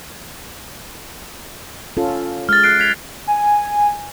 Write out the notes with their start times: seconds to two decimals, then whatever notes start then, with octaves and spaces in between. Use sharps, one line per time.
1.97 C#4 F4 A4
2.49 G#3 F6 A6
2.63 F#6 C7 D7
2.79 G#6 B6 F7
3.27 G#5